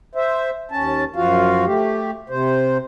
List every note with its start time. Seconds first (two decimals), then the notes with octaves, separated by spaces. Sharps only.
0.15 C5 E5
0.71 D#2 C#4 A5
1.16 F#2 F3 F4 F#4 F5
1.66 A3 G4
2.29 C3 C5